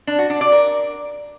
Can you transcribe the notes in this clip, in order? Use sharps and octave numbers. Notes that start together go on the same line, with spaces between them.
D4
F#4
D4
D5
A#4